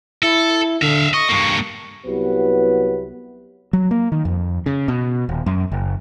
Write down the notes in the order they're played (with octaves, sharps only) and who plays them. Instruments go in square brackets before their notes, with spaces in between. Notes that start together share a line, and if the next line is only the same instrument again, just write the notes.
[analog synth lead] E4 [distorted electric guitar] A4
[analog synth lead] D3 [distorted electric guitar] E5 F5
[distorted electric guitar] D#5 [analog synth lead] C#6
[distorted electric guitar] G2 A#3
[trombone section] C2 F#3 B3 E4 G4 B4
[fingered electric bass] F#3
A#3
D#3
F2
C#3
B2
D#1
F#2
F#1